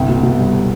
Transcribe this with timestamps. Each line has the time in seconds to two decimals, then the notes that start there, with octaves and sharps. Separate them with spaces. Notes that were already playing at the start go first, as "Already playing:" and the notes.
Already playing: G1 C2 G5
0.09 B2
0.23 B2
0.39 G3